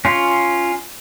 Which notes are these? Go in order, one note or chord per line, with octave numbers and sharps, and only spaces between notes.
C#4 F4